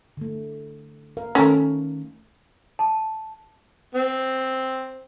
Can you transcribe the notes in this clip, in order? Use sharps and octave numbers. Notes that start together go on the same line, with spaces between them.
D3 A3
A#4 F5
D#3 A3 C#4 A4 A#4
A5
C4